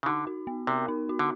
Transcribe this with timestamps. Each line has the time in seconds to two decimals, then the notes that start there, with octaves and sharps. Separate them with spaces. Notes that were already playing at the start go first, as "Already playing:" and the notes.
0.03 C#3
0.06 D3 D#4
0.27 F#4
0.47 B3
0.67 C3 A#4
0.88 D#4
1.09 F#4
1.19 D3